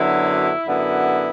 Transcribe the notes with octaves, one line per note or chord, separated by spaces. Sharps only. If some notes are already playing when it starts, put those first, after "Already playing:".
Already playing: F#2 D3 F#3 B3 D4 E4
F#2 D3 B3 E4